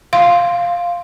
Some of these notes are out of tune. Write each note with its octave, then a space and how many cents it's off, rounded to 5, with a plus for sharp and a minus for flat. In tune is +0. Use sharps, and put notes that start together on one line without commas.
F5 +0 C6 +0